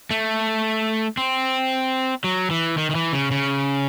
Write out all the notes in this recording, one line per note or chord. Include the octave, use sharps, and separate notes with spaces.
A3
C4
F#3
E3
D#3
D#3
E3
C#3
C#3